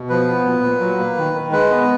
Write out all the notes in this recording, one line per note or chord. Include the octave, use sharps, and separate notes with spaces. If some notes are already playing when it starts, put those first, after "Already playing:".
Already playing: B2
F3 B4
B3
A#2
A#2
F#3
A#3
D#3
D#3
G#3 B4
B3